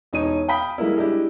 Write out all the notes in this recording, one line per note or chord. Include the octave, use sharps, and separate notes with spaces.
E1 D#4 C#5 D#7
F5 G5 B5 D#6 B6
G3 G#3 A#3 E4
G#3 D4 E4 G4